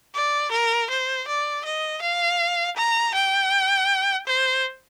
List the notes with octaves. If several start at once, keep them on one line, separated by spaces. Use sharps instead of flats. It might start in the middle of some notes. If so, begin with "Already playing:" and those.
D5
A#4
C5
D5
D#5
F5
A#5
G5
C5